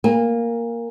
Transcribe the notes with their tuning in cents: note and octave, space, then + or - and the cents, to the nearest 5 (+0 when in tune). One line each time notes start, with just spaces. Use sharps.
A#3 +0 G#5 -35